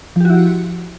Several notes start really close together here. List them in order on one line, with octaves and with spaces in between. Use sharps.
F3 G4 F#4 E4